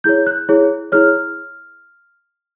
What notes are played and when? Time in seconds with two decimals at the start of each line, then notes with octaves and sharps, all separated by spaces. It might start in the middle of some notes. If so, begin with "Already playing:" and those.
0.04 E4 G#4 C#5 G6
0.27 F#6
0.49 E4 G#4 C#5
0.92 E4 G#4 C#5 F6